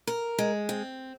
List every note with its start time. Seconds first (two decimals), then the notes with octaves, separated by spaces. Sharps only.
0.07 A#4
0.39 G#3
0.69 C4